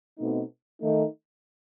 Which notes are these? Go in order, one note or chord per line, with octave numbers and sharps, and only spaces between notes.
B2 A3 C4 D#4
D#3 A3 D#4